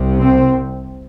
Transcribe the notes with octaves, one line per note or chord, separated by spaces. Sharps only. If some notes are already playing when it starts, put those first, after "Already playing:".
Already playing: C2 C3
C4